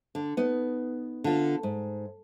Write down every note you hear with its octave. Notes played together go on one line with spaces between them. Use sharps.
D3
B3 D#4
D3 F4
G#2